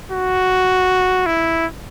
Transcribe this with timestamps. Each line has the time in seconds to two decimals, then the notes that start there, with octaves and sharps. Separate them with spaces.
0.12 F#4
1.26 E4